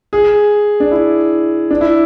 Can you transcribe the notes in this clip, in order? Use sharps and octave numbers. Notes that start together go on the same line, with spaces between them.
G#4
D4
E4
D4
E4